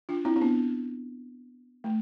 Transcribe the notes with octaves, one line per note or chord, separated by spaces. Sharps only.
D4 F4
C4 E4
C4
B3 D4
A3